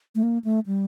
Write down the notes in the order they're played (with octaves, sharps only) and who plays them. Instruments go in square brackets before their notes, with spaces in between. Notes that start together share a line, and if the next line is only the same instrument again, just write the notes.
[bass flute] A3
A#3
A3
G3